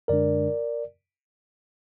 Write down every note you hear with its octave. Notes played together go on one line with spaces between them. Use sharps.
F#2 D3 G#3 D4 A#4 D5